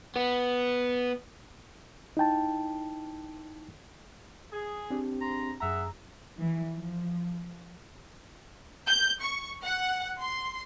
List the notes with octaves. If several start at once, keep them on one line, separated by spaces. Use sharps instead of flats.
B3
D#4 E4 G5 A5
G#4
C4 D4 G4
G#2 A#5 C6
F#2 G#4 E5 F#5 A#5
E3
F3
G6
C#6
F#5
C6